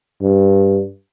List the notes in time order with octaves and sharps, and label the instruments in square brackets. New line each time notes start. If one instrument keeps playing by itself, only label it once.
[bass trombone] G2